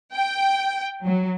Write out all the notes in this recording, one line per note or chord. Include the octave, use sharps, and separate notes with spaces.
G5
F#3